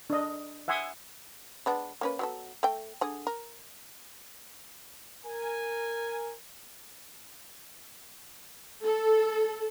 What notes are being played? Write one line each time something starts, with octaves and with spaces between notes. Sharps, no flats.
D4 D#5
E5 F#5 G#5 C6 D#6
G#3 B3 D4
A#3 C#4 B4
F#3 B3 A4
A3 G5
D3 G#4
A#4
A#4 G#5
A4